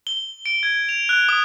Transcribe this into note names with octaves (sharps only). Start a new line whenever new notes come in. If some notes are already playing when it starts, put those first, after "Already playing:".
G7
D7
G#6
F7
F#6
D#6